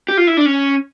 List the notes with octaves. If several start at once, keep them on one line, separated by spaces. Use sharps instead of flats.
G4
F4
E4
D4
C#4